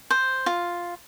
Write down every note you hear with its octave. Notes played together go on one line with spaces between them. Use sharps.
C5
F4